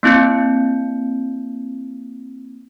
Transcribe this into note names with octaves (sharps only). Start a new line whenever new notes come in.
A#3 C4 E4 G6 C#7